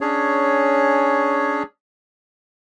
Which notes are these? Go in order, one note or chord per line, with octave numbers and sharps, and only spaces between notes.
C#4 D4 G#4 C#5